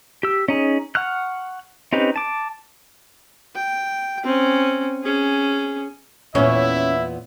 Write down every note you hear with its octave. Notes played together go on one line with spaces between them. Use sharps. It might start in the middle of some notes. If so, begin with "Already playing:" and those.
G4 E6
C#4 D#4 G#4
F#5 C#6 F6 F#6
C4 C#4 D#4 G4 B4
A5 D6
G5
C4 C#4
C#4 G#4
E2 A#2 B3 C#4 E4 E5